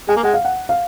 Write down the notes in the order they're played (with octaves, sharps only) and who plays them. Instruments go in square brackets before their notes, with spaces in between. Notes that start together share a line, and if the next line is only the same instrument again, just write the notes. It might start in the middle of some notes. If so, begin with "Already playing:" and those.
[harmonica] G#3 [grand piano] G#5
[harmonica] A#3
[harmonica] G#3 [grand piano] F#5
[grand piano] F5
F#5
F5